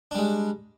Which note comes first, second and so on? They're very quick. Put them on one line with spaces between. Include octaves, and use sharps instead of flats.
D4 G3 G#3